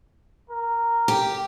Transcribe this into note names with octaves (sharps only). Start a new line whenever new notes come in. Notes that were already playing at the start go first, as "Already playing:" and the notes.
A#4
G4